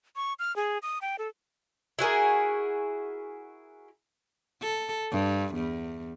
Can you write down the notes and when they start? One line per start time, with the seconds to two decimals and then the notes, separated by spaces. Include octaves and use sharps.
0.16 C#6
0.39 F6
0.56 G#4
0.82 D#6
1.02 G5
1.19 A4
1.99 E4 F#4 G#4 A#4
4.62 A4
5.12 G2
5.55 E2